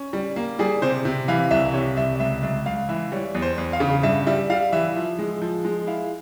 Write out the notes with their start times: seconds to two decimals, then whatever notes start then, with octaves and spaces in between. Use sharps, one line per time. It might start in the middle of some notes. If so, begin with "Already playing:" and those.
Already playing: C#4
0.13 G3
0.36 A#3
0.59 G3 G#4
0.82 C3 C5
1.05 C3
1.28 E3 F5
1.51 C2 E5
1.73 C3 C#5
1.97 C2 E5
2.20 C#2 E5
2.43 C#2 E5
2.66 C#2 F5
2.89 E3 E5
3.12 G3 C#5
3.35 E2
3.42 C5
3.58 E2
3.73 F5
3.80 C#3
4.03 G2 E5
4.27 G3 E5
4.50 G3 F5
4.72 E3 E5
4.96 F3
5.19 G#3
5.42 F3
5.65 G#3
5.87 E4 F5